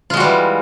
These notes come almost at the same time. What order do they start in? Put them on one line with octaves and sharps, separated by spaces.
F4 G#3 F#4 G3 E3